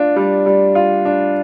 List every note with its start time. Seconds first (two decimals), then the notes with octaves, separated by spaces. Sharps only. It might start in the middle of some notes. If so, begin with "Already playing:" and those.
Already playing: D4 F4
0.16 G3
0.46 G3
0.75 F4
1.05 D4